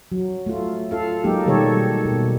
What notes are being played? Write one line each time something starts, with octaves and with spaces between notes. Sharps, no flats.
F#3
A3 F4
F4 A4 F5
F#3 G#3 A#3 D#4 G4
B2 D#3 G3 A4 C#5
B2